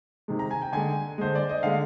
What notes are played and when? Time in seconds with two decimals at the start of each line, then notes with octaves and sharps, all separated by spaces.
0.28 C3 D#3 G#3
0.39 A#5
0.51 G#5
0.62 G5
0.73 D3 G#3 G#5
1.18 D3 G#3 C5
1.35 D5
1.49 D#5
1.63 D3 G#3 F5